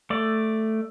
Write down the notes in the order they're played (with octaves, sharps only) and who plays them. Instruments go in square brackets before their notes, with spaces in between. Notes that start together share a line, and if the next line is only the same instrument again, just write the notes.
[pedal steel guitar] A3 D5